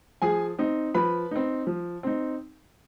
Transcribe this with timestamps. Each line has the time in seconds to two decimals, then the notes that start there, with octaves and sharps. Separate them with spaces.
0.22 F3 G#4 G#5
0.59 C4 D#4
0.95 F3 B4 B5
1.31 C4 D#4
1.67 F3
2.03 C4 D#4